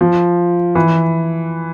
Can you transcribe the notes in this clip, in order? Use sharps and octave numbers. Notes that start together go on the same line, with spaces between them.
F3
E3